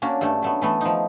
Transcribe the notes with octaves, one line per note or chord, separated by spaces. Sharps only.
A#3 C#4 D4 F#4
G2 A3
F#3 A3 B3
E3 A3 B3
F3 D#4